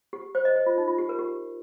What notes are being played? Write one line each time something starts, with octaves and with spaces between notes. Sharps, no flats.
G4
C5
D#5
C5
F4
D#4
F4
G4
A#4
G4